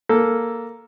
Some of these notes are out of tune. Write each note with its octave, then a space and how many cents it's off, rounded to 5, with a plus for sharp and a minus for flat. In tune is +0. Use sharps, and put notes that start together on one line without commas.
A#3 +0 A4 +0